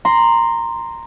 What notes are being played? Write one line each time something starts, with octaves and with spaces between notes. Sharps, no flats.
A#5 C6